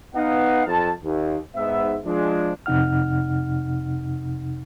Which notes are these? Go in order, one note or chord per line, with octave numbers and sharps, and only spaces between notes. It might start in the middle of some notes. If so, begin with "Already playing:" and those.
B3 D#4 F5 F#5
F2 A5
D#2
G#2 B3 E5
F3 G#3 D4
F2 C3 D#4 F#5 F6